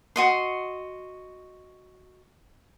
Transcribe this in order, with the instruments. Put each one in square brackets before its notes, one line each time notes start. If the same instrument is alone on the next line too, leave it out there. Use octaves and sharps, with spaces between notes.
[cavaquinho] F#4 D#5 C6